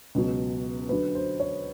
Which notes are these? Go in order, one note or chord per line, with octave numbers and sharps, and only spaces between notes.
C#2 B2 F#3
D2 D3 F#3 B4
C5
C#5